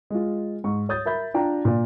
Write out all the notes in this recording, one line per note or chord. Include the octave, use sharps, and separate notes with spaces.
G#3 F4
G#2 C#6
C#5 D#6 G6 A6
A#4 E5 B5 G6
D4 F4 G5 A#5
A#2 D5